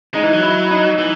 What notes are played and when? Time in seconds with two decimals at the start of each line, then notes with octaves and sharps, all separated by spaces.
0.14 G#3 D#4
0.24 E3
0.33 F#3
0.43 E4
0.71 D#4
0.99 E3